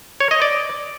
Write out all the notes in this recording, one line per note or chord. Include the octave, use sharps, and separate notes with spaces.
C#5
D#5
D5